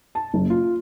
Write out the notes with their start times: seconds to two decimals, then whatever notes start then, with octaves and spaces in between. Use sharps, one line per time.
0.15 A5
0.34 F#1
0.50 F4